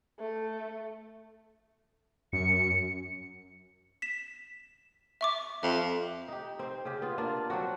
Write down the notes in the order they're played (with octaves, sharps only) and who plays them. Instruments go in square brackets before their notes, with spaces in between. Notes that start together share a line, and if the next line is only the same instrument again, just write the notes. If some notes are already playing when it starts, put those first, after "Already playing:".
[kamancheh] A3
[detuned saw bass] F#2 [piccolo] C#7
[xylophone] B6 E7
E5 C#6 D6
[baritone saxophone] F2 [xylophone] E5
[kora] D#4 G4
C4 C5
C#3 G4
B3 F4
A#3 D4 F4 F5
F#3 C4 D4 F#4